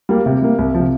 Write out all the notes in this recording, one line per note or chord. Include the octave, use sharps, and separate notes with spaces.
G3 A#3
C3
G3 A#3
C2
F3
C3